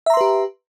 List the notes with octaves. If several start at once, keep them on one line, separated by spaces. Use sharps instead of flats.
G4 B4 E5 A#5 C6